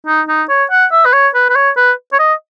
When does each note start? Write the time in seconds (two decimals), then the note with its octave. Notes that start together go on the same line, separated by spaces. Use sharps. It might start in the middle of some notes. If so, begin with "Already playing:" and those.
0.07 D#4
0.28 D#4
0.49 C#5
0.71 F#5
0.92 E5
1.05 B4
1.13 C#5
1.35 B4
1.50 B4
1.55 C#5
1.77 B4
2.13 C#5
2.19 D#5